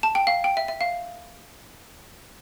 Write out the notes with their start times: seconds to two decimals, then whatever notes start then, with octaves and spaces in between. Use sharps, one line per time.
0.03 A5
0.15 G5
0.27 F5
0.44 G5
0.57 E5
0.68 E5
0.81 F5